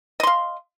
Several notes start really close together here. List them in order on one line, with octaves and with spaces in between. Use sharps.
D#5 C6 F5